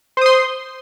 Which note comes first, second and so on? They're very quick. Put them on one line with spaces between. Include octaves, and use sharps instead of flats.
C5 D#6 C6